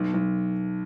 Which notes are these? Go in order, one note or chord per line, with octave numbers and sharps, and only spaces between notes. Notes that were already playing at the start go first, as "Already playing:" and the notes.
Already playing: B1
B1